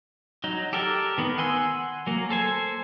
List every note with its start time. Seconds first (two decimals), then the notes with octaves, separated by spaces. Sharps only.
0.44 F#3 D#4
0.73 G4 A4 A#4 D5
1.18 D#3 B3
1.38 F#5 G#5 C6 E6
2.07 F#3 A#3
2.30 A4 C5 G#5